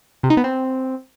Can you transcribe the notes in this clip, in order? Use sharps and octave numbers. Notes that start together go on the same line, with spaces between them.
C3
D#4
B3
C4